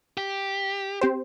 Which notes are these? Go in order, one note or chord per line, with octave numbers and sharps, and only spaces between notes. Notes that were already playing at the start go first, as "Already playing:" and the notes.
G4
C4 G4 C5